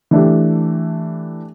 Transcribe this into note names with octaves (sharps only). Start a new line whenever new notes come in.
E3 A3 D4 G4